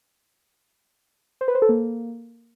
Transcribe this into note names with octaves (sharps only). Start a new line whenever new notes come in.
C5
B4
C5
A4
A#3